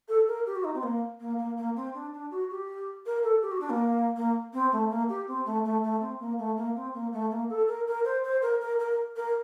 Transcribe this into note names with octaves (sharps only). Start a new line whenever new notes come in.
A4
A#4
G4
F#4
D#4
C4
A#3
A#3
A#3
A#3
C4
D4
D4
F#4
G4
A#4
A4
G4
F#4
D4
A#3
A#3
C4
A3
A#3
G4
C4
A3
A3
A3
C4
A#3
A3
A#3
C4
A#3
A3
A#3
A4
A#4
A#4
C5
C5
A#4
A#4
A#4
A#4